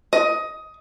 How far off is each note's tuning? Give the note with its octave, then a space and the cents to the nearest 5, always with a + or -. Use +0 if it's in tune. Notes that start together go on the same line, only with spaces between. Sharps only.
D#5 +15